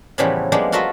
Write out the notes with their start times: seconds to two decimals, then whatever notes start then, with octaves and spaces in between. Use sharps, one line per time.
0.18 A2 C#3 E3 F3 G3 B3
0.52 F3 G3 G#3 A#3 B3 D4
0.72 F4 F#4 A4 A#4 D#5 E5